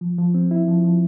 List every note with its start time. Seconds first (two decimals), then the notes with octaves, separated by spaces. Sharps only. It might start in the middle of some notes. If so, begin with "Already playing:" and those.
0.01 F3
0.18 F3
0.34 C4
0.51 E4
0.68 F3
0.84 F3